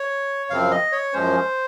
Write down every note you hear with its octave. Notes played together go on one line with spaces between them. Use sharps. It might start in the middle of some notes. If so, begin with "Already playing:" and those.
Already playing: C#5
F#2 C#3 F3 C4 F5
D#5
C#5
F#2 F3 G#3 C#4 C5